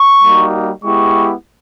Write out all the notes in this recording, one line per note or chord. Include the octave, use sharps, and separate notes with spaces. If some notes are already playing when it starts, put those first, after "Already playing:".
Already playing: C#6
G3 A#3 D#4 F#4
G#3 B3 E4 G4 C#6